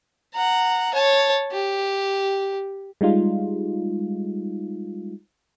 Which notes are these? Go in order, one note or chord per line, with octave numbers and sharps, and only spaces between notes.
F#5 A#5
C#5 A5
G4
G3 G#3 D#4 F4